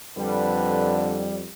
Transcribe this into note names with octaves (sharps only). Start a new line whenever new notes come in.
F2 D3 G3 B4